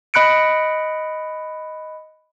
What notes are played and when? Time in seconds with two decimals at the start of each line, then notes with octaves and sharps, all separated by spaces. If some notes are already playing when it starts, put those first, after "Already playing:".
0.14 D#5 B5 F#6 C#7 D7